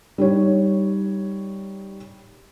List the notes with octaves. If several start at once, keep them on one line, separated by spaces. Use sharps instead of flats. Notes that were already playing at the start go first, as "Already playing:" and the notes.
G3 D#4 C#5